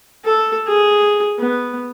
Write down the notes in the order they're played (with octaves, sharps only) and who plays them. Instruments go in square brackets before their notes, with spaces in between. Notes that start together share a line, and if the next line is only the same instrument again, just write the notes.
[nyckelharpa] A4
G#4
B3